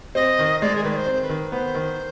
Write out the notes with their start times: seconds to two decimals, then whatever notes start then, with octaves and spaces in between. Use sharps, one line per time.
0.15 C4 D#5
0.39 D#3
0.61 G#3 D5
0.76 G#4
0.84 D#3 B4
0.91 D5
0.96 C5
1.06 C4
1.22 B4
1.29 D#3
1.52 B3 C5
1.75 D#3